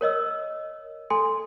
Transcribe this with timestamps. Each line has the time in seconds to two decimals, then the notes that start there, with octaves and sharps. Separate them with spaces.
0.01 A#4 C#5 D#5 E6
1.10 A4 G#5 C6